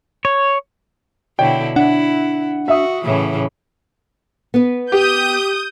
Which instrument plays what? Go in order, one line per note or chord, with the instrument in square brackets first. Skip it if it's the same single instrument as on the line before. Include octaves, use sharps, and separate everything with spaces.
[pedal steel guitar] C#5
[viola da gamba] B2 D3 E4 [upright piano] C#5 [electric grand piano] G5
[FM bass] D4 [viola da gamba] E4 [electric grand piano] F#5
[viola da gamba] F#4 [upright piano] E5 D#6
[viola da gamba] A2 C#3 E3
[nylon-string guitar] B3 B4
[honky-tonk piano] G4 [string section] D#6 G6